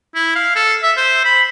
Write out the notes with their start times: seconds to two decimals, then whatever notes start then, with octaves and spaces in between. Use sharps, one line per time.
0.15 E4
0.35 F5
0.56 A4
0.83 E5
0.97 C5
1.25 B5